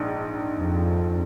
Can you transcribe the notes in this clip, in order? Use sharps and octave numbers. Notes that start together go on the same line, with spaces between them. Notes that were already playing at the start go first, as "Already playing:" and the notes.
Already playing: A#1 G#2
F2